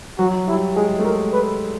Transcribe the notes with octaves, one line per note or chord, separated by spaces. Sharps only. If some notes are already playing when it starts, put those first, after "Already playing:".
F#3 F#4
G3 E4
G#3 G#4
A3
G#3 A#4
B4